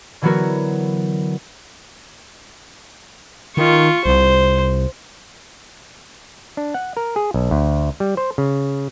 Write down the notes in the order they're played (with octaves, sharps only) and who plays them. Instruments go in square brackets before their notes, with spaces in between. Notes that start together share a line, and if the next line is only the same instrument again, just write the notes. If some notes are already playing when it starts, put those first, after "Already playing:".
[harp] D3 E3 F#3 B3 F#4 A#4
[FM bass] D#3 [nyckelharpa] F4 C#6
[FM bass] C2 [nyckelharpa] C5
[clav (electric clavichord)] D4
F#5
A#4
G#4
B1
D2
G3
C5
C#3